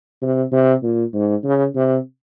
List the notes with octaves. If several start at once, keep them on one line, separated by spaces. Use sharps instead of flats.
C3
C3
A#2
G#2
C#3
C3